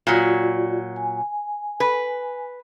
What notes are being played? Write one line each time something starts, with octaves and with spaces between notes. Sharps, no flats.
A#2 F#3 F4 F#4 D5
G#5
B4